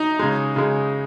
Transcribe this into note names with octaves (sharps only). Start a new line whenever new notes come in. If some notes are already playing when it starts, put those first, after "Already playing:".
Already playing: D#4
C#3 G#3
C#3 G#3